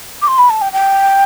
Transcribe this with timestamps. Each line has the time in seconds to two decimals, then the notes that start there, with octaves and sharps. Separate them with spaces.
0.22 D6
0.28 C6
0.38 B5
0.50 A5
0.61 G5
0.73 G5